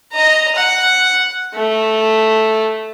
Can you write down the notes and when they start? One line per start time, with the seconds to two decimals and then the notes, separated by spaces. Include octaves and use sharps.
0.12 D#5 A#5
0.55 F#5
1.54 A3